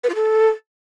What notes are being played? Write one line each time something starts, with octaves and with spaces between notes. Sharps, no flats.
B4
F4
A4